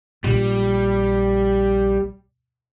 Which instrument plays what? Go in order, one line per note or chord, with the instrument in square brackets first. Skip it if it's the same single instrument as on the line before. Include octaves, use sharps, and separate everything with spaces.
[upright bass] A#1 [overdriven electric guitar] G3